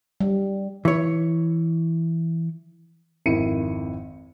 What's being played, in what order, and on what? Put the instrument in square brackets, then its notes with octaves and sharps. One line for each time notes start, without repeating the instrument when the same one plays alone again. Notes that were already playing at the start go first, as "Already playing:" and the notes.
[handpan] G3
[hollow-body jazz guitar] E3 C#5
[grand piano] G#1 F2 D#3 E4 C#7 D#7